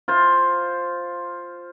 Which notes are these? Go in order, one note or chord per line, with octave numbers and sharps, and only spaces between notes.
F4 C5